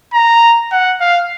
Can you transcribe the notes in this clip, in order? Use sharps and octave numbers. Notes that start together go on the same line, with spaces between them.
A#5
F#5
F5